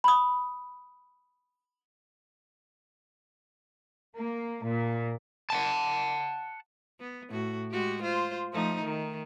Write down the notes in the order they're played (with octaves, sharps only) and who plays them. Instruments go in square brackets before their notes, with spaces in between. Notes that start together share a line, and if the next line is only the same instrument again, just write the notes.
[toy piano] B5 D#6
[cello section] A#3
A#2
[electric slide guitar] F#5 G5 A5
[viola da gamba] B3
A2 F#4
G#3 F#4 G4
F4 C5
F3 A3 D#4
D#3